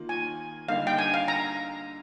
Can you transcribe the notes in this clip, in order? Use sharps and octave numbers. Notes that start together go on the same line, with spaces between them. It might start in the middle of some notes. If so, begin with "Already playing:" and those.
Already playing: D#3 A#3 F4
G#5
D3 G3 A#3 D#4 G4 F5
G5
G#5
F5
A#5